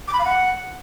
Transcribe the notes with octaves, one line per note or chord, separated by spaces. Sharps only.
D6
B5
F5
F#5